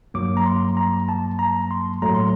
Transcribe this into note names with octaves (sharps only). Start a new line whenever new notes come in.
G2 F#3 A#3 D6
A#5
C6
A#5
A5
A#5
C6
A2 F#3 A3 A#5
C6